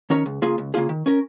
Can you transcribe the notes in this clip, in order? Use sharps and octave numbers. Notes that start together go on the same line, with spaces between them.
D#3 C#4 A#4 C#5
C#2
C#3 A#3 F4 G#4
C#2
C#3 A#3 F4 G#4
D#3
C#4 A#4